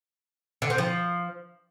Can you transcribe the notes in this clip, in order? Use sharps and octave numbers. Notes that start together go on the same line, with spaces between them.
D3
C4
F3